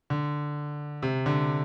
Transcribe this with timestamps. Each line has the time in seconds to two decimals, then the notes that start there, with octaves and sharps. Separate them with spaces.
0.10 D3
1.02 C3
1.26 D3